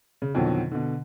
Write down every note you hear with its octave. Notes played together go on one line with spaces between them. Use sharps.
C#3
F2 B2 D3 D#3 F#3
B2 D3